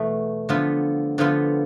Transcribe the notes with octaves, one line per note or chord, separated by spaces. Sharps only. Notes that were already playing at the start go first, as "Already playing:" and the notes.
Already playing: E2 B2 A3
D3 F3 B3 F4
D3 F3 B3 F4